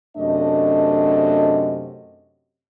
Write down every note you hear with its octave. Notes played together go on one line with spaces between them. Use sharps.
F#2 C3 A3 D4 D#5